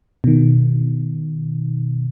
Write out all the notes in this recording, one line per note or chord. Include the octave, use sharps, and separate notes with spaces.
B2 D#3